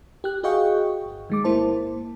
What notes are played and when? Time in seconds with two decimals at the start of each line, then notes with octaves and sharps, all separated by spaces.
0.24 G4 F#6
0.43 F#4 G#4 D#5 F5 G5 C#6
1.06 G1
1.30 D#3 G#3 D6
1.44 G1 A#3 E4 C5 A5